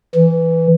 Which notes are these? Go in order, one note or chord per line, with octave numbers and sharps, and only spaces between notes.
E3